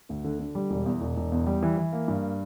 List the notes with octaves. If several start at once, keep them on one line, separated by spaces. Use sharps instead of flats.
D2
D3
D3
G3
E1
E2
E1
E1
E2
G3
E3
E3
A#3
G2